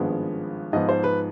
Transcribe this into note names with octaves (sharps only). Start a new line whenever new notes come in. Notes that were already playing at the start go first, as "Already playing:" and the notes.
Already playing: G#1 G2 F3 G#3 B3
G#2 F3 B3 D#5
C5
B4